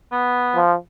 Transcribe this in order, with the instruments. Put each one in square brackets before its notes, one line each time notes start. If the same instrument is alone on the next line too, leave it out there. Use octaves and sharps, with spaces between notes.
[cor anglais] B3
[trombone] F3